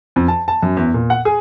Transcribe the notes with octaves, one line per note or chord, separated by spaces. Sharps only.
F2
A5
A5
F#2
E2
A#2
F#5
G#4